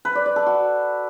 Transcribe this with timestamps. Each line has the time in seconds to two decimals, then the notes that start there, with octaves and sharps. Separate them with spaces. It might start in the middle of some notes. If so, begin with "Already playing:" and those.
0.05 B4
0.15 D5
0.26 D5
0.36 A4
0.47 F#4